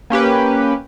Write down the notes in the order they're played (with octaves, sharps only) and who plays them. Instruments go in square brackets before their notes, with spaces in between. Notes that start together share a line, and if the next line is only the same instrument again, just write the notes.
[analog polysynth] A#3 C#4 G4 B4